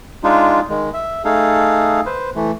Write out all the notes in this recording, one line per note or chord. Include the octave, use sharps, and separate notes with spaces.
G#3 D4 D#4 F4
D#3 G#3
E5
A3 D#4 G#4 A4 F5
B4 C5
E3 A3